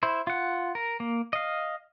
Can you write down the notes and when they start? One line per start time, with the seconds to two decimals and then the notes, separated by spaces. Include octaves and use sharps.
0.03 E4 C5
0.27 F4 F#5
0.75 A#4
1.00 A#3
1.33 D#5 F5